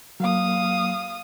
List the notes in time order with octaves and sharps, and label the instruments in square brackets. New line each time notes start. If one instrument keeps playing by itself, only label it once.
[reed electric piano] F#3 A#3 [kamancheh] F5 D#6